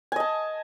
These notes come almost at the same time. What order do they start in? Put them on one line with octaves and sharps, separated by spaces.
G#5 D#5 A5